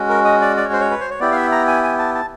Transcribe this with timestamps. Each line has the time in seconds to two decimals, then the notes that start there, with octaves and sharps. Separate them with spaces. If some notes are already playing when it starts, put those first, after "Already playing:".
Already playing: G#3 C#4 F#4
0.09 A#4
0.25 D#5
0.41 D5
0.57 D5
0.65 C#5
0.73 C5
0.80 C#5
0.91 B4
1.00 C5
1.10 C#5
1.20 B3 E4 G4 D5
1.31 F5
1.36 E5
1.52 A#5
1.68 G#5
1.83 G#5
1.99 A5
2.15 A5